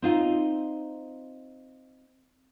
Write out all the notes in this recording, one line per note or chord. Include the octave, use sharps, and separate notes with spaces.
C4 D#4 F4